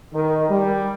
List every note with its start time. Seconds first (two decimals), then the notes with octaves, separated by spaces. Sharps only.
0.14 D#3
0.50 G3